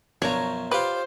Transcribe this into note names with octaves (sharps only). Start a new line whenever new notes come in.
F#2 B2 F3 D4 C#5 A#5
F4 G4 B4 C5 D5